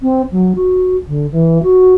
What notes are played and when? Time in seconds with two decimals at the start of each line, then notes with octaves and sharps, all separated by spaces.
0.01 C4
0.32 F#3
0.55 F#4
1.08 D3
1.31 E3
1.63 F#4